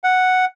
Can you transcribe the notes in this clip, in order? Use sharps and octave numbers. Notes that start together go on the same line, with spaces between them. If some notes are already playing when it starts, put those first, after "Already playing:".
F#5